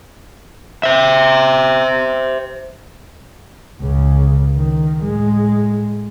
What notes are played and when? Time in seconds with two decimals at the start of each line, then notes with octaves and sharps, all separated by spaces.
0.83 C5 E5
3.81 C#2 C#3
4.56 D#3
5.01 A2 G#3